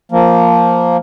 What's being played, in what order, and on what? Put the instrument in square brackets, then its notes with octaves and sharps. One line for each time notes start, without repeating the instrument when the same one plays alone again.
[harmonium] F3 A#3